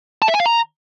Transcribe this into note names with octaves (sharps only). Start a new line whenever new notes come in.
A5
E5
G#5
F5
A#5